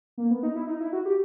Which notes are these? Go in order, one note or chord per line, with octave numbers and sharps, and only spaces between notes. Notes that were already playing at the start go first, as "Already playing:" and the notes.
A#3
B3
D#4
E4
D#4
E4
F#4
G4